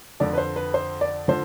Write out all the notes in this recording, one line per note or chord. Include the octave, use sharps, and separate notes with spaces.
F2 D3 F3 D5
B4
C5
B4
C5
D5
D3 F3 C5